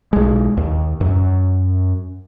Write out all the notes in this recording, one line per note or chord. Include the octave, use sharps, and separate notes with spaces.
B1 G#3
D#2
F#2